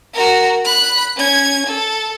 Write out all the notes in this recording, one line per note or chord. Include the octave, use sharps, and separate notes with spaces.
F#4 A#4
B5 F#6
C#4 G#6
A4